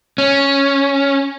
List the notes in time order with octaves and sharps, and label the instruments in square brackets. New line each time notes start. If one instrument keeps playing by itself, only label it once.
[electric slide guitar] C#4